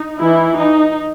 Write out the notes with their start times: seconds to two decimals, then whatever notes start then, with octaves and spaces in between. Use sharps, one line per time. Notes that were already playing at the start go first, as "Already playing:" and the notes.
Already playing: D#4
0.20 E3 E4
0.57 D#4